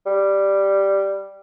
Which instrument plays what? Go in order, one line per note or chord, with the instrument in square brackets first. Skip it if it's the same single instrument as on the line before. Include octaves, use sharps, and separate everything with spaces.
[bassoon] G3